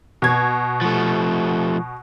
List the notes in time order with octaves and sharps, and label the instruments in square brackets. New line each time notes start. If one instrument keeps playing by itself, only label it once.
[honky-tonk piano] B2 G#6
[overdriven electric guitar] F3 A3